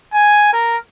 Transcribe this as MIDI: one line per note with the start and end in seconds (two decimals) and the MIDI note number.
0.14 0.53 80
0.53 0.77 70